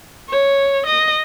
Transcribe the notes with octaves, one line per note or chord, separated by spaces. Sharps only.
C#5
D#5